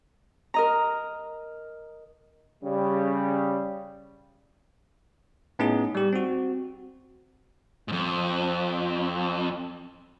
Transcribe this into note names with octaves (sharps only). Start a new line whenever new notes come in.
A#4 D#5 A#5
C#3 G3
A2 B3 C#4 D#4 G#4
G3 G4
C4 F#4
F2 G#2